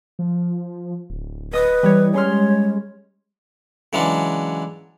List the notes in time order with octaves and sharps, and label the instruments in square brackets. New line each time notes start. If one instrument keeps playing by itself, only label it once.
[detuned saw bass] F3
D1
[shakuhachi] B4 [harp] D#5 D#6
[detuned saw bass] E3 [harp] G3 C#5
[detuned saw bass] E3
[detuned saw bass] G#3 [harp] C#4 C6 F6 [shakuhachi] C#5
[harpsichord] C#3 E3 F#3 G#3 C#4 D4